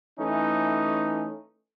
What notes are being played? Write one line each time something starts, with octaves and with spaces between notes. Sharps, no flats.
E3 A3 C#4 D#4